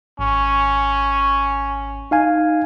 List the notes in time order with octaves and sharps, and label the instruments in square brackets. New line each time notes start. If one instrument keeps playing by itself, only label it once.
[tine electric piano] G#1 [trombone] C#4
[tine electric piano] D#4 F5 G#5